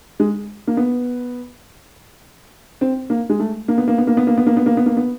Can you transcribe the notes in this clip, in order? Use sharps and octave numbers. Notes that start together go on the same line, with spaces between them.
G#3
A#3
B3
C4
A#3
G#3
A3
A#3
B3
A#3
B3
A#3
B3
A#3
B3
A#3
B3
A#3
B3
A#3
B3